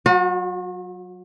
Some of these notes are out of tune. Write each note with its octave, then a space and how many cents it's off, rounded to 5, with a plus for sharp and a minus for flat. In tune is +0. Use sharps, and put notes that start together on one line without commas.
F#3 +0 F#4 -45